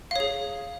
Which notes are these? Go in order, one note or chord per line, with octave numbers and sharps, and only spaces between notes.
G#4 C#5 F5